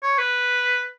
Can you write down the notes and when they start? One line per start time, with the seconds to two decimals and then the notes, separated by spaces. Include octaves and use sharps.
0.03 C#5
0.18 B4